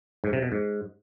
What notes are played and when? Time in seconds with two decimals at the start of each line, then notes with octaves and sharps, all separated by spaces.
0.24 G#2
0.33 C3
0.42 B2
0.52 G#2